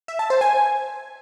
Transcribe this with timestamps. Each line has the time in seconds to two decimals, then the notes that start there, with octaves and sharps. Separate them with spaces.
0.08 E5
0.19 A5
0.30 C5
0.41 G#5